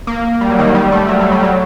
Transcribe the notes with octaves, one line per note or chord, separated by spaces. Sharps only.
A#3
G3
F#3
D#3
F#3
G3
A3
F#3
F#3
G3
F#3